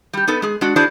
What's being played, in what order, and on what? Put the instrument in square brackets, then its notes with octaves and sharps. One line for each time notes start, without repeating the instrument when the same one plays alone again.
[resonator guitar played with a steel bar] G3 G4
B3 D#4 A4 B4
G#3 G#4
G#3 D4 F#4 D5
D4 E4 F#4 G#4 C5 D5